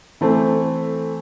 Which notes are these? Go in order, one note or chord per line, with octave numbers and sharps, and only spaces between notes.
E3 A3 C4